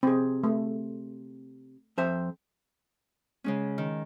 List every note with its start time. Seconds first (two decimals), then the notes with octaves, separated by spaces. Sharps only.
0.03 C3 C4 G#4
0.44 A3
1.98 F2 C5 E5
3.44 C#3 G#3 C#4
3.78 D#3